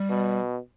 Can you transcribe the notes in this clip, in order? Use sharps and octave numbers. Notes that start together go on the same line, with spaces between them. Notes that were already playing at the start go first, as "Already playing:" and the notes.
Already playing: G3
B2